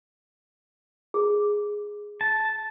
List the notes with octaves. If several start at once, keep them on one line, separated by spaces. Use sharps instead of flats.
G#4
A5